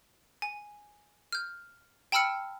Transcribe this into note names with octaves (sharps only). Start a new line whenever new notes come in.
G#5
F6 G6
G5 A5 B5 E6 F6 C#7